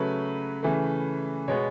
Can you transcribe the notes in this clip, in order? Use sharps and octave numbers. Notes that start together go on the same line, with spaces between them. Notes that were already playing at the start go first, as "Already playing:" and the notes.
Already playing: C#3 F#3 A3 B4
C#3 E3 A3
B2 G#3 B3 C#5